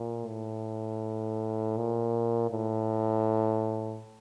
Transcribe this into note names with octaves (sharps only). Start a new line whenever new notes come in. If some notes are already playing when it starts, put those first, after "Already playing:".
Already playing: A#2
A2
A#2
A2